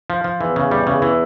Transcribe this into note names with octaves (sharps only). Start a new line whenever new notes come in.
F3
F3
E2 E3
C#3
G3
C#3
E3